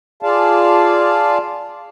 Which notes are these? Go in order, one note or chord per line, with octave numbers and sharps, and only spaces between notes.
F4 G#4 D5 F5 A5